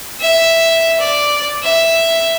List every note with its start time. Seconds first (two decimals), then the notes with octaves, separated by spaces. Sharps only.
0.21 E5
1.00 D5
1.63 E5